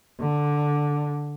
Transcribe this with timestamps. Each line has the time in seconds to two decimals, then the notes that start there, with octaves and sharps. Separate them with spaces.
0.20 D3